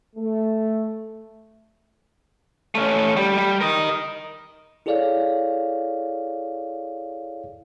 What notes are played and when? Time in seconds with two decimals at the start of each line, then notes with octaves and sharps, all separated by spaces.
0.16 A3
2.75 A3 C#4
3.17 G3
3.38 G3
3.61 A#4 D#5
4.86 E4 G#4 A4 C#5 D5 F5